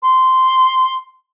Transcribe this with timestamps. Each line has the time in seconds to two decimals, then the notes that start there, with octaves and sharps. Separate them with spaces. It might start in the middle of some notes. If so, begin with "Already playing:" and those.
0.02 C6